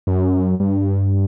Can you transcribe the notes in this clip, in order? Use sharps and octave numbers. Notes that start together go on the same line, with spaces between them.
F#2
G2